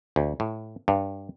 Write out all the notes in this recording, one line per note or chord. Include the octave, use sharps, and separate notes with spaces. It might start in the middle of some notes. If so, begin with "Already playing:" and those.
D2
A2
G2